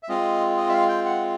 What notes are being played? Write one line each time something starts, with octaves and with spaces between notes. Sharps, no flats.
E5
G#3 C4 F4 D#5
D#5
E5
F5
G5
F#5